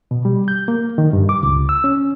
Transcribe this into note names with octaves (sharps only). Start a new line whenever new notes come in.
B2
G3
G6
A#3
D#3
G2
D6
C#2
E6
C#4